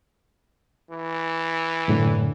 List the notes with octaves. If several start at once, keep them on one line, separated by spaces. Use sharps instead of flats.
E3
F#2 A2 D3